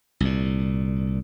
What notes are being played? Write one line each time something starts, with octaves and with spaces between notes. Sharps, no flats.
C2 A#2